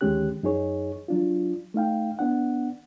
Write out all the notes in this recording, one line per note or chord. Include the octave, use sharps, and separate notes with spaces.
D2 D#3 G#3 C#4 G4 F#6
F#2 D#4 G#4 C#5
F#3 D4 F4
A3 D#4 F5 G5
B3 D4 F#5